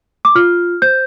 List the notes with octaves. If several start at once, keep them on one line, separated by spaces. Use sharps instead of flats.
D6
F4 F6
C5 G6